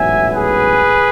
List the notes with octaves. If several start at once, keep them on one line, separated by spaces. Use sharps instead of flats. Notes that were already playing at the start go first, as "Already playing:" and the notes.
Already playing: A1 G#2 F#3 B3 E5 G#5
G#4 B4